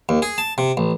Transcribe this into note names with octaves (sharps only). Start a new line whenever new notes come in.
D#2
G#4
A5
C3
A1